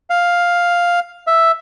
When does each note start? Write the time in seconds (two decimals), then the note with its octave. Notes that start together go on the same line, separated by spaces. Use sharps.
0.10 F5
1.27 E5